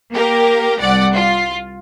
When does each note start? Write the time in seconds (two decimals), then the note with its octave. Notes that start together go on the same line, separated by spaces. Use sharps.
0.12 A#3 G4 A#4
0.80 C2 D5 F#5
1.15 F4